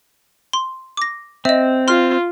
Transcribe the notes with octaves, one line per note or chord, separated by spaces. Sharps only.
C6
D6 A#6
C4 D#5 E5
F4 C6 F6